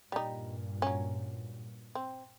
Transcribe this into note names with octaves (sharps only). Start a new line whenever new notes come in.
G2 A#2 G3 D#4
F#3 C#4
C4